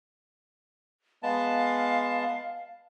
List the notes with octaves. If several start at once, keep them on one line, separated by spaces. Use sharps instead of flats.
G#3 B3 F5 A5